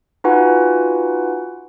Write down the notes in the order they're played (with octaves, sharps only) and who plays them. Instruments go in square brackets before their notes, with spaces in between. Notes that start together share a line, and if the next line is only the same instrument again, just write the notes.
[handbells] D#4 F4 F#4 B4 F#5 G#5